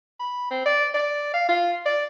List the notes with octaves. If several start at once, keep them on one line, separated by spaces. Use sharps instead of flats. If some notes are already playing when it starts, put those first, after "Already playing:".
B5
C4
D5
D5
F5
F4
D5